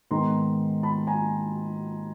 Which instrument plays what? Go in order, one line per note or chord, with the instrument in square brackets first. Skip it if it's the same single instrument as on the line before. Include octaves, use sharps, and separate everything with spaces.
[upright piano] G#2 D#3 G#3 B3 A#5 C6
A5 B5
G#5 A#5